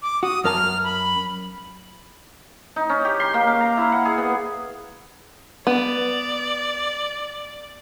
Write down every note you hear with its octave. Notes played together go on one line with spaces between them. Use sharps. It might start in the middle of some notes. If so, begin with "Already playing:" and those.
D6
F#4 D#6
F#2 A#4 A5 F6
B5
D#4
C#4
G4
C6
A#3
F5
A#5
E4
F#5
G#4
B3
B3 D5